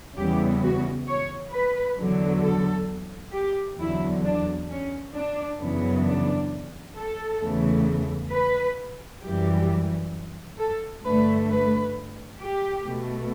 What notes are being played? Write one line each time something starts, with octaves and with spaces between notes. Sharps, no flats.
E2 C#3 E3 G3 B3 G4
F#4
C#5
B4
E2 D3 F#3
A4
G4
E2 D3 F#3 E4
D4
C#4
D4
F#2 C#3 E3 B3
D4
A4
E2 C#3 E3 A3
B4
F#2 E3 G3 G4
A4
G2 D3 A3 B4
B4
G4
B2 A3